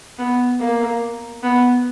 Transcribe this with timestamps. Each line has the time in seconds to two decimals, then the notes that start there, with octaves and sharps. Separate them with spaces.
0.19 B3
0.60 A#3
1.43 B3